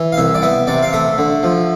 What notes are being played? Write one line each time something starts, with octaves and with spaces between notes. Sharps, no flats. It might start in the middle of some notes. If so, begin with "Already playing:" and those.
Already playing: E3
F5
C2 E5
D5
B3 E5
C3 D5
F5
A3 E5
D3
F3